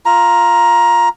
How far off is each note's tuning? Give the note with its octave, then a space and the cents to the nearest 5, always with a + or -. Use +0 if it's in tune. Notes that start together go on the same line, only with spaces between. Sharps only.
F4 +0 A#5 +15